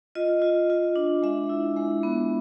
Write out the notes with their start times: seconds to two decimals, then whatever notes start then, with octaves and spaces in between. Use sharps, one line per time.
0.15 F4 D#5
0.42 F4
0.70 F4
0.96 D4
1.22 G#3 E5
1.49 E4
1.76 G#3
2.03 B3